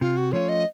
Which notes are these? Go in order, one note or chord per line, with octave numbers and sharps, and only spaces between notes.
C3 F4
F#4
F3 A3 C#4 F4 C#5
D#5